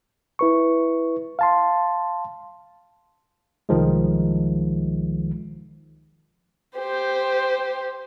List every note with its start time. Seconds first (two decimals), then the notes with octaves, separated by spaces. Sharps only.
0.39 E4 B4 C#6
1.39 F5 A5 C6
3.69 C2 D#3 F3 G#3
6.78 G4 C5